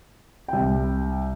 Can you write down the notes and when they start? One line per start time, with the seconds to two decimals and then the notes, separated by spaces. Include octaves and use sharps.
0.48 C2 G5